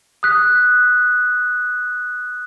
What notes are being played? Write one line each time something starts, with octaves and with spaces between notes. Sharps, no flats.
D#6 F#6 B6